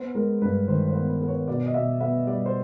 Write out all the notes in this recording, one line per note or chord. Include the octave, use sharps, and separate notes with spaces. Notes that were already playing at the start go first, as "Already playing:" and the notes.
Already playing: B3 C5
G#3 A#4
G2 B4
D#3 C5
C5
B3
B4
B3
C#5
B2 D5
D#5
B2 E5
B3 E5
G3 D5
C5